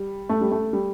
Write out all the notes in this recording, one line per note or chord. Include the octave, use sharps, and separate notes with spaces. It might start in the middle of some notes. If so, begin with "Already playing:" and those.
Already playing: G3
A3
G3
A3
G3